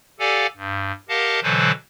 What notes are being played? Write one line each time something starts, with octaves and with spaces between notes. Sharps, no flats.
G4 A4 D5 F5 F#5 G#5
G2
G4 A#4 D#5 F5 F#5 A5
B2 D3 E3 F#3 B4 C5